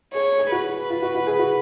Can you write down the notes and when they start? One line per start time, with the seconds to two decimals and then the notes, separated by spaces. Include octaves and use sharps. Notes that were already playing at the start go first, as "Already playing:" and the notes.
0.13 G#4 C#5
0.39 G#4
0.51 F#4 B4
0.90 F4
1.02 F#4
1.15 F#4
1.27 G#4
1.39 F#4